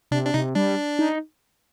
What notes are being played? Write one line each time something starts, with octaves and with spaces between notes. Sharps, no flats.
C3 D4
D4
C3 D#4
G3 D4
D#4